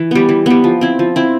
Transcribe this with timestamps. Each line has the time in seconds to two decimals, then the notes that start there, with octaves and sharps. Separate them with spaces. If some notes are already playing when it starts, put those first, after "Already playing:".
Already playing: E3
0.11 G3 B3
0.29 E3
0.46 G3 B3
0.64 F3
0.81 C4 E4
0.99 F3
1.16 C4 E4